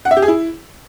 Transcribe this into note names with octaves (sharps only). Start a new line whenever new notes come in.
F#5
E5
G4
G#4
E4